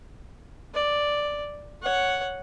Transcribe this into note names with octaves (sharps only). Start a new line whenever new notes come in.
D5
C#5 F#5